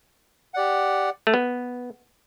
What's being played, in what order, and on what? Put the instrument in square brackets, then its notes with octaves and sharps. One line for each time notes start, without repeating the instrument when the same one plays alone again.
[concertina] G4 D5 F#5
[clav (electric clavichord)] A3
B3